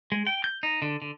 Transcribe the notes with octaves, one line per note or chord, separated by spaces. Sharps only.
G#3
G5
G6
D#4
D3
D3